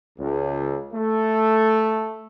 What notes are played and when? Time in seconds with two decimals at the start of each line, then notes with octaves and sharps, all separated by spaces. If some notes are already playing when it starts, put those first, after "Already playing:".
0.19 C#2
0.94 A3